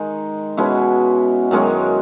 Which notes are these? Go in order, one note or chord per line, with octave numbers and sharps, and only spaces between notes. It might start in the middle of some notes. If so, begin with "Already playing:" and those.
Already playing: D#3 G#3 D#4
B2 G#3 C#4 E4
F#2 D#3 G#3 C#4